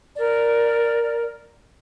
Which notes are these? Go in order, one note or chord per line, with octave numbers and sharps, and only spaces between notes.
A#4 D5